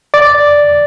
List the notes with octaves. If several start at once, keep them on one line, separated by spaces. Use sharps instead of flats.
D5